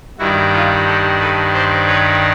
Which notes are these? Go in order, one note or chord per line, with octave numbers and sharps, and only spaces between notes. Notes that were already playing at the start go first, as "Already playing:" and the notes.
G2 D#3 G3 E4 F#4
D#4 F4
G4 A4
A4 B4
C5 D5
B4 C#5